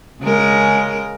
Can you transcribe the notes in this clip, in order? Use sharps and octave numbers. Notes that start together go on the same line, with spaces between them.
C#3 G#3 A#4